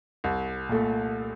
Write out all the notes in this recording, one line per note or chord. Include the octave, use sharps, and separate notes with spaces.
C2
A#2 A3